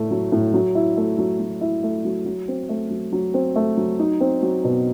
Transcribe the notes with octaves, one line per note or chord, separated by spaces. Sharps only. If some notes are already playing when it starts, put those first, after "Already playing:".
Already playing: A2 A3 E4
F#3
A2
F#3
E4
A3
F#3
F#3
E4
A3
F#3
F#3
C4
A3
F#3
F#3
C4
A3
F#3
D#4
C4
F#3
B2